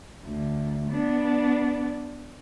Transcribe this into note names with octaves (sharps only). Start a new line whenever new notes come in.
D2
B3 D4